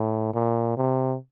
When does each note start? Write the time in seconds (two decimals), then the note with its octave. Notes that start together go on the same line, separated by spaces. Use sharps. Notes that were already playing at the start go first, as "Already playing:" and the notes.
Already playing: A2
0.34 A#2
0.77 C3